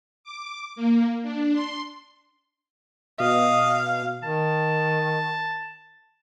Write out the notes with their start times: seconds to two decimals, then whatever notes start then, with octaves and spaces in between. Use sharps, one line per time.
0.24 D6
0.76 A#3
1.23 D4
1.53 C6
3.20 B2 D#5 F5
4.23 D#3 A5